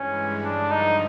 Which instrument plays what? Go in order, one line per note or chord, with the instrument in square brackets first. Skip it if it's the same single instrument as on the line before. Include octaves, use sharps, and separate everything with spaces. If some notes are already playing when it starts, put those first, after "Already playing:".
Already playing: [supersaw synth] G2 E3 G#3 [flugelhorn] C#4
[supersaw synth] G2 D3 F3 [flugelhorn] D4
[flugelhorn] D#4